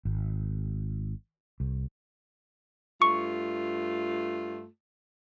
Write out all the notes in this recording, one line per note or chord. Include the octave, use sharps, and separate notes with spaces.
G#1
C2
G2 A3 F4 C#6